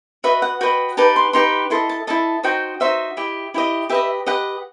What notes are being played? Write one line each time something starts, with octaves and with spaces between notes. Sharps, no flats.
F#4 B4 D#5 E5
F#5
F#4 B4 D#5 G5
D#4 G4 B4 A5
C6
D#4 G4 B4 C6
E4 A4 D#5 C6
A5
E4 A4 D#5 A5
D#4 F#4 C5 D#5 G5
D#4 F#4 C5 D#5 E5
E4 G4 D#5
E4 G4 D#5
G4 B4 D#5 E5
G4 B4 D#5 F#5